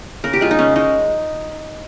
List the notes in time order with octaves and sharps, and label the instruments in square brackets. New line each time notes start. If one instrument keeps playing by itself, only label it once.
[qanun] C#3 A#4
G4
G#3 F4
D#4
C#3 C#4
G#3 D#4